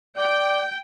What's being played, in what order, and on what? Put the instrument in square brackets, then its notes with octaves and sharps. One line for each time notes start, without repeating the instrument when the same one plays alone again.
[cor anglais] D5 [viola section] G5